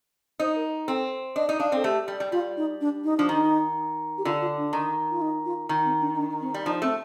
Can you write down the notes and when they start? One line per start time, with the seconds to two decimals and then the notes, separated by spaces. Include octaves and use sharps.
0.40 D#4 C5
0.56 A#4
0.88 C4 A4
1.36 D4 D#5
1.49 D#4
1.60 D4 F5
1.72 C4 A4
1.84 A3 G4
2.08 G3
2.20 G3
2.32 G3 F4
2.57 D#4
2.81 D4
3.04 D#4
3.17 F3 D4
3.29 D#3 D#4
4.18 G4
4.25 D3 F4
4.42 F4
4.57 D4
4.73 D#3
5.11 F4
5.22 D#4
5.45 F4
5.69 D#3 D#4
5.85 C4
6.01 D4
6.17 D4
6.41 C4
6.54 G3
6.66 F3 D#4
6.82 A3 C4